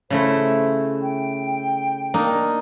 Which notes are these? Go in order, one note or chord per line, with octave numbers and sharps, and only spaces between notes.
C#3 A3 E4 C5
G5
A#3 D4 D#4